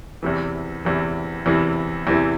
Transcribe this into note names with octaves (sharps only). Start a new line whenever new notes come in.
E2 C3 E3
E2 C3 E3
E2 C3 E3
E2 C3 E3